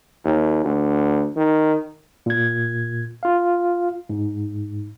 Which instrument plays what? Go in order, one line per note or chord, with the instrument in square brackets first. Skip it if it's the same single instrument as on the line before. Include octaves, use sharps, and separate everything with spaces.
[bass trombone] D#2
D2
D#3
[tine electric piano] A#2 G#6
F4 F5
G#2